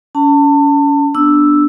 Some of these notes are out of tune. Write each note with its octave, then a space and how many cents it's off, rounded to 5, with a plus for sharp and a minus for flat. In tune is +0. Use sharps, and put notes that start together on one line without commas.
C#4 +35 A5 +30
B3 -10 D4 +0 E6 +0